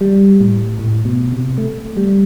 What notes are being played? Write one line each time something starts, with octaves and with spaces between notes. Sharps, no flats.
G3
A2
A2
B2
C3
A3
G3